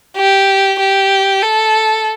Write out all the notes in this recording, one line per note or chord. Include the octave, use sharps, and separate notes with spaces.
G4
G4
A4